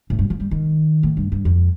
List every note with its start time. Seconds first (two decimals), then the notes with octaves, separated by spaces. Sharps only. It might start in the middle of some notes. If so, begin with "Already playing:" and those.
0.10 A2
0.19 G2
0.30 F3
0.40 G3
0.51 D#3
1.03 A2
1.17 G2
1.32 G2
1.45 F2